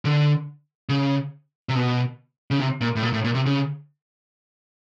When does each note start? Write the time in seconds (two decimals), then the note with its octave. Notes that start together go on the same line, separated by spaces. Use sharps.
0.05 D3
0.89 C#3
1.69 C3
1.75 B2
2.51 C#3
2.60 C3
2.81 A#2
2.96 A2
3.03 A#2
3.13 A2
3.24 A#2
3.35 C3
3.46 C#3